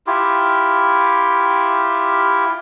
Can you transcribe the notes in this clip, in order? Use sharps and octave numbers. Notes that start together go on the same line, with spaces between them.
E4 F4 G4